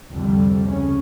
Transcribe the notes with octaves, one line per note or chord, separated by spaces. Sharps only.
C2 F2 D3 G3
D2 C#3 C#4